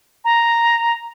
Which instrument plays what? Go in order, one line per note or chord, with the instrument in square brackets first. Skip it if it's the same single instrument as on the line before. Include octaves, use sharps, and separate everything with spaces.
[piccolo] A#5